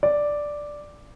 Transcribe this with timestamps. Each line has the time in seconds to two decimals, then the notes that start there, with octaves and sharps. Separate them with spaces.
0.03 D5